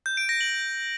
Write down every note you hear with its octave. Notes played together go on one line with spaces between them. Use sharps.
G6
D7
A#6
F#7